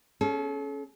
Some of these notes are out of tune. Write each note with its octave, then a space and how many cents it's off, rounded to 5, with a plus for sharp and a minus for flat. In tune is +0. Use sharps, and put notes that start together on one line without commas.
C#4 +0 A4 -40